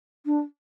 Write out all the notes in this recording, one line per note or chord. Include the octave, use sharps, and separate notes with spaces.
D4